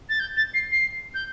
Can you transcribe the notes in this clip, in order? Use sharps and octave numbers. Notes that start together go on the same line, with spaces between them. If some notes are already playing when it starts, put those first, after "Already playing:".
A6
G6
A6
C7
C7
G6